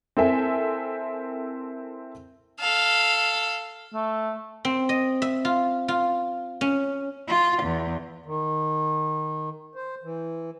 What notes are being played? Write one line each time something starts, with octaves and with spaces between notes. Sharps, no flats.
C4 E4 A4 A#4 E5 G#5
A4 F5
A3
C4
D#5
E5
F4
F4
C#4
F4
E2
D#3
C5
E3